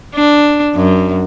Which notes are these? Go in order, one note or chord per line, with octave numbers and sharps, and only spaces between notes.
D4
F#2